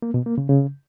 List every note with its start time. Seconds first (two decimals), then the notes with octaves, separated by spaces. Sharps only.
0.02 A#3
0.14 B2
0.26 A#3
0.38 C#3
0.49 C#3